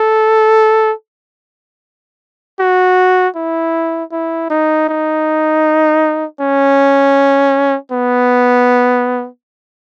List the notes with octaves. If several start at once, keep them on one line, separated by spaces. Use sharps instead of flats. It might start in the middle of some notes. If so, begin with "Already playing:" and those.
Already playing: A4
F#4
E4
E4
D#4
D#4
C#4
B3